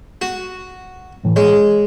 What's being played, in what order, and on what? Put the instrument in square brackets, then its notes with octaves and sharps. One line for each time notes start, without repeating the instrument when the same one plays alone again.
[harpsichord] F#4
[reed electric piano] F#2 A2 E3
[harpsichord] G#3 [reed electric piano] C#5